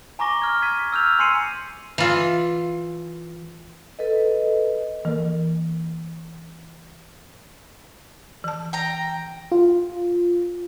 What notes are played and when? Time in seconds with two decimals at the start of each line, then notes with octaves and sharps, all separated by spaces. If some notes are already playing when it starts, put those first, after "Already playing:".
0.19 G#5 A#5 C#6 D6 A#6 G7
0.42 F6 G#6
0.62 G#6 B6 D#7
0.92 E6 F6 G6 F7
1.19 G#5 C6 E6 C7 C#7 D#7
1.98 E3 F4
3.99 A4 B4 D#5
5.05 E3 A#3 A#4
8.44 E3 A5
8.73 G5 A#5
9.52 F4